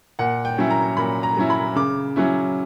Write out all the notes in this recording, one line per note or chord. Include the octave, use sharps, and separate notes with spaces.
A#2 F#5
G5
F#3 C#4 E4
A#5
A#2 B5
A#5
F#3 C#4 E4
B5
C#3 D6
F#3 C#4 E4